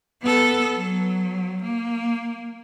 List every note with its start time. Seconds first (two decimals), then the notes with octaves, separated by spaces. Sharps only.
0.22 B3 A4
0.76 F#3
1.62 A#3